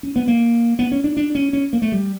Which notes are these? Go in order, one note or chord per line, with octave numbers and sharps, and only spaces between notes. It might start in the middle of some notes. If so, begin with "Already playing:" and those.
C#4
B3
A#3
B3
C#4
D4
D4
C#4
C#4
A#3
A3
G3